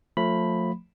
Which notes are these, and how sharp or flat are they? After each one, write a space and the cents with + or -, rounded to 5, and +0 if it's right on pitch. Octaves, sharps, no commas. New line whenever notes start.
F3 +30 A3 +20 B5 +0